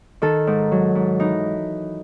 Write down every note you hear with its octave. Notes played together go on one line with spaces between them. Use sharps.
D#3 A4
G#2
F#3
G#2
E3 D#4